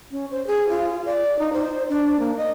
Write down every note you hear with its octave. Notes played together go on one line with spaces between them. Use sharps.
C#4
C5
G#4
F4
D5
D#4
C5
D4
A#3
D#5